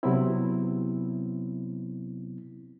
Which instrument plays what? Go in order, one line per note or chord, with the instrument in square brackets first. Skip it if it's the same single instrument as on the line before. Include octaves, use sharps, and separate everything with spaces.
[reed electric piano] C3 F#3 B3 C4 E4